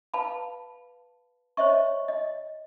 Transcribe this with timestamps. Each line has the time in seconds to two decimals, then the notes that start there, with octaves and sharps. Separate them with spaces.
0.14 B4 F5 A5 B5
1.57 C5 C#5 D#5 E5 C#6
2.08 D#5